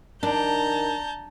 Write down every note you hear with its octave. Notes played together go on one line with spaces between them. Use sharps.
D#3 D4 A5 A#5 G6